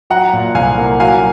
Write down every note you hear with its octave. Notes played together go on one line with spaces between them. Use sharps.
F#3 F#5 A#5
A#2
C2 F5 G#5
A#3
F#3 F5 G#5